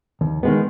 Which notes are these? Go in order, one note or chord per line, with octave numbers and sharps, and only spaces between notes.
D#2
D#3 G#3 B3